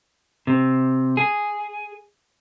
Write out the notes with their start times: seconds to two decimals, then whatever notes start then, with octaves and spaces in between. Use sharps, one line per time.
0.47 C3
1.17 G#4